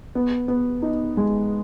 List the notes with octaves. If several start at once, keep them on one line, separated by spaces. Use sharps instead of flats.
B3
B3
D#4
G#3